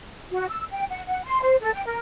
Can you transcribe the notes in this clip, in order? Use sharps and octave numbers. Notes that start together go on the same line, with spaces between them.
F#4
E6
G5
F#5
F#5
C6
C5
A4
G5
A#4